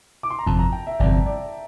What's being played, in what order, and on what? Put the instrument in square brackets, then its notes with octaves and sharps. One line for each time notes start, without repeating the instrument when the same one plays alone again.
[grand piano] D6
C6
A#5
[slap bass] G1 F2 C3 [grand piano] A5
[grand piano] A#5
G5
E5
[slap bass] G1 F2 C3 [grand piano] D5
[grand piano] D5